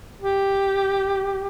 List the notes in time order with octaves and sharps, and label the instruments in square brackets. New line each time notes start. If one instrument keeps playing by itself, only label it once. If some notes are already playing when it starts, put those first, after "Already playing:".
[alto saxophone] G4